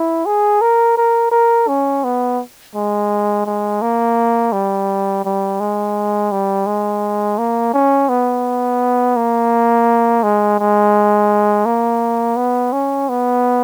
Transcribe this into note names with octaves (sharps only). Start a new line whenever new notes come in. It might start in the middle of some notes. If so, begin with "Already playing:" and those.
Already playing: E4
G#4
A#4
A#4
A#4
C#4
B3
G#3
G#3
A#3
G3
G3
G#3
G3
G#3
A#3
C#4
B3
A#3
G#3
G#3
A#3
B3
C#4
B3